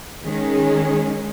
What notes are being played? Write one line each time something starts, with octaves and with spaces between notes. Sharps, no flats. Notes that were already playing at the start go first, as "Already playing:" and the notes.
D#3 G#3 C#4